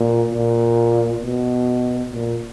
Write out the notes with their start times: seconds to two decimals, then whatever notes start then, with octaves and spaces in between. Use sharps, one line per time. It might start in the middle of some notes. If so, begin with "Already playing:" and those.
Already playing: A#2
0.32 A#2
1.21 B2
2.11 A#2